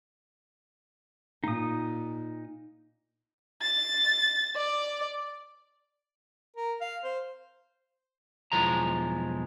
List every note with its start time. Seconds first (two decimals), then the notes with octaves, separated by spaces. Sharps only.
1.44 A#2 D#4 D#6
3.62 A6
4.56 D5
6.57 A#4
6.81 F5
7.04 C5
8.52 B1 E2 F3 G#3 A#5